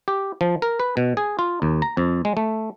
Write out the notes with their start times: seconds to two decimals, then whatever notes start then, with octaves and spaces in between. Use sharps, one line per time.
0.08 G4
0.41 F3
0.62 A#4
0.80 B4
0.97 B2
1.17 G#4
1.39 F4
1.62 D#2
1.82 A#5
1.97 F2
2.25 G#3
2.37 A3